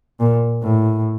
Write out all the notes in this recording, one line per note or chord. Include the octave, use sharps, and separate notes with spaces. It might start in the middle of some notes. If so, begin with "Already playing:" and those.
A#2
A2